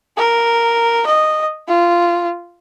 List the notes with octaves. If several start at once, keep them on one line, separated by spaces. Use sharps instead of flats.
A#4
D#5
F4